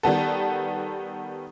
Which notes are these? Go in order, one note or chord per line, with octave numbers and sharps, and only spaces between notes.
D#3 G3 B3 A4